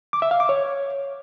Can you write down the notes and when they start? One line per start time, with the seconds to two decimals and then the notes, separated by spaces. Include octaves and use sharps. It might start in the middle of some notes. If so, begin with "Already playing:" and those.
0.13 D6
0.22 E5
0.31 F5
0.40 D6
0.49 C#5